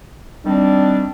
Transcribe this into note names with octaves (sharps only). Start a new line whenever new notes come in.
D#3 G3 C4 D4